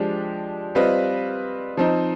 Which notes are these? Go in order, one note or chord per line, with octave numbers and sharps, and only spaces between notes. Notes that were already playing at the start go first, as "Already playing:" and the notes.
Already playing: F3 G#3 D4 G4
G3 C4 F4 B4 D#5
F3 C4 D#4